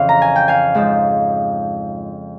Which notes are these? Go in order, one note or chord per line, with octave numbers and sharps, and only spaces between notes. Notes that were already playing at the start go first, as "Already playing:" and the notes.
Already playing: F2 C#3 E3 F5
A#5
G#5
G5
F5 G#5
G#2 F3